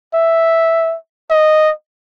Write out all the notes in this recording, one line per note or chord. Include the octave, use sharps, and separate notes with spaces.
E5
D#5